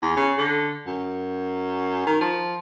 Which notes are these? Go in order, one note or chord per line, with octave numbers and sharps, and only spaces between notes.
E2
C#3
D3
F#2
D#3
F3